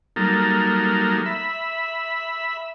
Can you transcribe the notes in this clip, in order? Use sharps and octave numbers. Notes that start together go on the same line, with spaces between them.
F#3 G3 A#3 D#4 A4 A#4
E5 B5